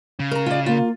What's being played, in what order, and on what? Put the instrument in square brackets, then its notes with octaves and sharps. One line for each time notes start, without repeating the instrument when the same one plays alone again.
[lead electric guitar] C#3
[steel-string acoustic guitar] A#4 A#5
F4 D5
[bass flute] A#3 [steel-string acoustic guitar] F4